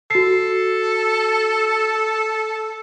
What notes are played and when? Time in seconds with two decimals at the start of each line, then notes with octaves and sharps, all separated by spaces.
0.11 F#4 A4 C7